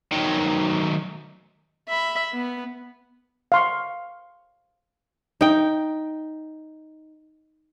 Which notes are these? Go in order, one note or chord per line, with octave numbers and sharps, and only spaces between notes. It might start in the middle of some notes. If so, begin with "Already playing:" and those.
D#3 F#3
E5 B5
B3
F5 C6 C#6
D#4 G5